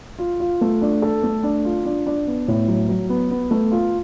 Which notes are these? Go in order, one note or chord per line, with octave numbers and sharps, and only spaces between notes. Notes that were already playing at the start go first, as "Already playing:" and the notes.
F4
F4
A3
D4
A4
A3
D4
F4
D4
D4
B3
A2
F#3
F#3
B3
B3
A3
F4